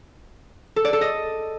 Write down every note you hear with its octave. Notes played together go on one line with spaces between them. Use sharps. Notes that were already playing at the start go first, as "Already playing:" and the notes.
A4
D5
A4
D#5